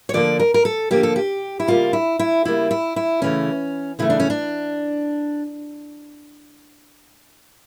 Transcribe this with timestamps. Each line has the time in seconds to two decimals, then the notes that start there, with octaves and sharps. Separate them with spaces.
0.09 C#5
0.14 D3 F3 A#3 D5
0.39 A#4
0.54 A#4
0.65 A4
0.91 D3 F3 A#3 G4
1.03 A4
1.16 G4
1.60 E4
1.67 C#3 G3 A#3 F4
1.93 E4
2.19 E4
2.45 C#3 G3 A#3 E4
2.71 E4
2.96 E4
3.22 C#3 E3 A3 C#4
3.99 C#3 E3 A3 E4
4.10 D4
4.20 C#4
4.30 D4